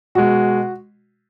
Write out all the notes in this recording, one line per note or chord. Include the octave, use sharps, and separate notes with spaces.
B2 G#3 F#4